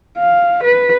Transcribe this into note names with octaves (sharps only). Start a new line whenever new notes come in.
F5
B4